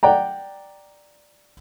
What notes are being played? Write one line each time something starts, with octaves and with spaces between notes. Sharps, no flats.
D5 F#5 G5 A#5